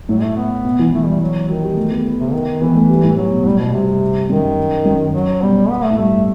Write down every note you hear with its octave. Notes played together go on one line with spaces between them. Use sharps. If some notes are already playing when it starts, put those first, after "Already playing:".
A2 F#3
A3
B3
B2
E3
E3 A3
G3
F#3
D#3 F#3
G3
A3
B3
B3
C3
D#3
E3 B3
A3
G3
A2
A2 F#3
B2
A2 G3
B2
G2 C3
F#2 D#3
F#2
F#3
B2 G3
B3
A3
A2
G2 A3